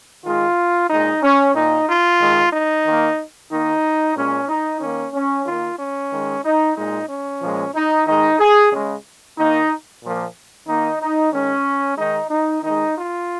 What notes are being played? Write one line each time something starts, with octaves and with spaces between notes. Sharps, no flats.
D#3 G#3 F4
A#2 G#3 D#4
C#4
A#2 A#3 D#4
F4
D#3 G#3
D#4
D#3 A#3
D#3 A#3 D#4
A#2 G#3 C#4
D#4
D#3 A#3 C#4
C#4
D#3 A#3 F4
C#4
D#3 G#3
D#4
A#2 G#3 D#4
C#4
A#2 F3 G#3
D#4
D#3 G#3 D#4
G#4
C#3 G#3
D#3 A#3 D#4
A#2 F3 A#3
D#3 A#3 D#4
D#4
D#3 G#3 C#4
D#3 G#3 D#4
D#4
D#3 G#3 D#4
F4